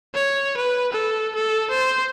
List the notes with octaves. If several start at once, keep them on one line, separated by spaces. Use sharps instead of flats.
C#5
B4
A4
A4
C5